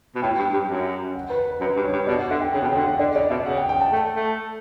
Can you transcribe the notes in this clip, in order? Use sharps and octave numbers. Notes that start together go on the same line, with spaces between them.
B2
A2 G5
G2
G2
F#2
F#5
B4
B4
F#2 B4
G2
C#5
G2
B2 D5
F#5
D3 E5
G5
C#3 F#5
B2
C#3 G5
D3 F#5
F#5
D3 D5
C#3 D5
B2 E5
C#3 F#5
G5
G5
A5
A3
A3